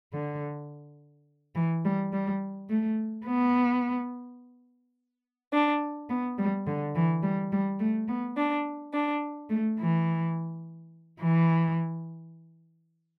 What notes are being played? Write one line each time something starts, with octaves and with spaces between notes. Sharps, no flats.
D3
E3
G3
G3
A3
B3
D4
B3
G3
D3
E3
G3
G3
A3
B3
D4
D4
A3
E3
E3